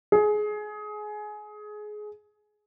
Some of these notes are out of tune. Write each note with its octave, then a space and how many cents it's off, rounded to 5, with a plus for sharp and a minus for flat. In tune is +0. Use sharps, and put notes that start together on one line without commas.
G#4 +20